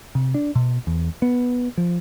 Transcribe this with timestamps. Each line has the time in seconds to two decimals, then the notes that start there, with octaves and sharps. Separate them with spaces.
0.15 C3
0.34 D4
0.55 B2
0.87 E2
1.22 B3
1.77 F3